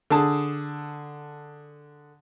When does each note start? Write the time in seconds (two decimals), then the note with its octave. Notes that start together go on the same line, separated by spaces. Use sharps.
0.10 D3 G#4 A5 D#6